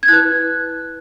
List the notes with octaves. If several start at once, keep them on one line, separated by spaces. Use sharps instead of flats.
G#6
E4 B4 F#6